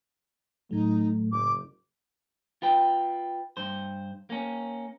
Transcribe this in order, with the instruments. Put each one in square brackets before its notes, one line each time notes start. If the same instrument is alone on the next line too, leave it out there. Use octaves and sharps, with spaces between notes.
[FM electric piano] A2 F#3 [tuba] A3 [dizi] D#4
[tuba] F#1 [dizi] D6
[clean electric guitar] F4 B4 G5
G2 C5
A#3 C#4